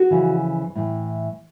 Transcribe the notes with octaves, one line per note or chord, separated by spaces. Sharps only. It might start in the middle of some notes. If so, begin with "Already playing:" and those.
Already playing: F#4
F2 C#3 E3
A2 E3